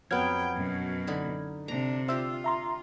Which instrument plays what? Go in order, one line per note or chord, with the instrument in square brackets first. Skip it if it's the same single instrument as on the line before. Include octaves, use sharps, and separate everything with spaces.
[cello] F2 G5 [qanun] F#3 B3 [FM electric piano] F#5 F6 G#6
[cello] F#2 B2
[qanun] D3 D#4 B5
[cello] C3 D4 [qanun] A#5
[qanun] D4 G4 [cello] F4 [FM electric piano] C5 E5 E6
[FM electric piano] E5 A#5 C6